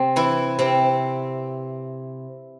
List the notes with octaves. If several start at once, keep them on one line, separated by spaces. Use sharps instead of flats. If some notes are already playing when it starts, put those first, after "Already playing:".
Already playing: C3 C4
E3 E4
C3 C4